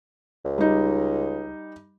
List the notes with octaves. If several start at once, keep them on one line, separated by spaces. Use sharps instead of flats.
C#2
G3 D#4